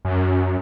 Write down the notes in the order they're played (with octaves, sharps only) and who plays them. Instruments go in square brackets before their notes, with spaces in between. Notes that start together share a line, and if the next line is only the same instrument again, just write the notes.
[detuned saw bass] F#2